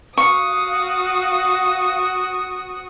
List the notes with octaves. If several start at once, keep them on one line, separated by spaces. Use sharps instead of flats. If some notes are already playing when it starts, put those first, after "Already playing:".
F#4 F5 C#6 D#6